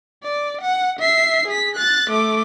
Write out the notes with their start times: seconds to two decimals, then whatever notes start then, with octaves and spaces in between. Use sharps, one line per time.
0.23 D5
0.61 F#5
0.99 E5 C7
1.48 G#4 B6
1.76 F#6 A6
2.10 A3 D6